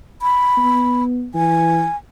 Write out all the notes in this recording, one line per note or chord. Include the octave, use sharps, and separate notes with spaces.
B5
B3
E3 G#5